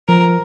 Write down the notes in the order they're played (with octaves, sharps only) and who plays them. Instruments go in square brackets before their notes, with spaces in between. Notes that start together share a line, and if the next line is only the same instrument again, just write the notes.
[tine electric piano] F3 [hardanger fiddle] A#4